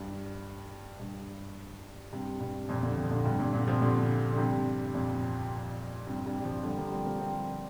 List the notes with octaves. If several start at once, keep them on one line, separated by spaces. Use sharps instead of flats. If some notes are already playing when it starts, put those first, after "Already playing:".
Already playing: G2
G2
G2 C3
G2 C3
F2 A#2
A#2 D3
C3 F3
A#2 D3
G2 C3
A#2 D3
A#2 D3
C3 F3
A#2 D3
D3
G2 C3
F2 A#2
G2 C3
G2 C3
G3
C3 F3
D3 G3
F3 A#3
G3 C4
F3 A#3
G3 C4